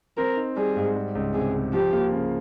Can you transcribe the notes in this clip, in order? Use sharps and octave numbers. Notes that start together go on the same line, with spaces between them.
C4 A#4
D#4
G3 G#4
G#2
G3
C#2
C3 G#4
C#2
F3 G4
A#3
C#3